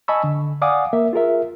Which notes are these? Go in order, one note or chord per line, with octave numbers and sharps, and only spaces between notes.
D#5 G#5 A5 B5 C#6 E6
D3
D5 F5 F#5 G#5 D6 D#6
A#3 A#4 E5
F4 G#4 A#4 E5